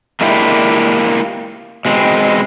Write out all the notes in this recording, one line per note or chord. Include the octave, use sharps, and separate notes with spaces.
G#3 A#3 D4 E4 F4 G4
B2 G#3 C4